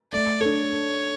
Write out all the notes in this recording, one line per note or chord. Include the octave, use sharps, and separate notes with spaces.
A3 D5
D4 A4 C#5